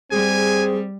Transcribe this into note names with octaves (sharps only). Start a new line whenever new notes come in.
G3 C4 G#4 G#5